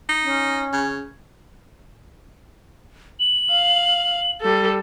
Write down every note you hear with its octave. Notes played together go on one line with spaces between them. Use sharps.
D#4
C#4
C#3
F#7
F5
G3 A4